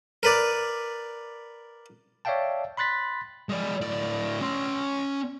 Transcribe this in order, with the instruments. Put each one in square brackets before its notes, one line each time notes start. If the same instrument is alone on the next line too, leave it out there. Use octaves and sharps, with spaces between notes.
[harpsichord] A#4 B4 D5
[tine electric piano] C#5 D5 E5 F5 G5 A5
B5 C6 F#6 A6 B6
[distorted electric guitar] G#3 D5
A2 D5
C#4 C6